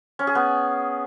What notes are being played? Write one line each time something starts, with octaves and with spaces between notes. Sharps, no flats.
C#4
G#4
B3